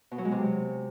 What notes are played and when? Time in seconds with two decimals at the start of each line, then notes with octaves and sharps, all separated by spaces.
0.11 B2
0.18 F#3
0.25 G#3
0.32 C3